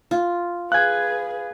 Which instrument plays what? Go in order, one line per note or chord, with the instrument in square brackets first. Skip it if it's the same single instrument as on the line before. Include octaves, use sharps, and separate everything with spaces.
[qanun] F4
[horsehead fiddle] G#4 B4 [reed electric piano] F5 G#5 [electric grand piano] F#6 G#6